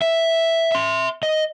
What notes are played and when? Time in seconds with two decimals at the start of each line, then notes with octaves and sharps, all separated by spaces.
0.02 E5
0.72 E5 C6
1.23 D#5